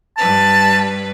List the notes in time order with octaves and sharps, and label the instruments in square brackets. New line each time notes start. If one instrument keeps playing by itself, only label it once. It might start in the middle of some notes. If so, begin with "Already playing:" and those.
[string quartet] G2 B4 [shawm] A5